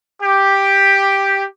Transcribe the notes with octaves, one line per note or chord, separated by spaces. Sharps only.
G4